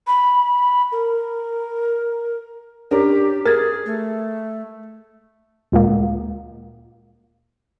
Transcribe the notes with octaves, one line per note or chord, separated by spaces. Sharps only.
B5
A#4
C#4 D4 G4 A#4
G#4 A#4 G#6 A6
A3
D2 A#2 G#3 A#3